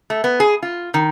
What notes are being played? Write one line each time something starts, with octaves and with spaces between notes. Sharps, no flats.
A3
B3
G#4
F4
D#3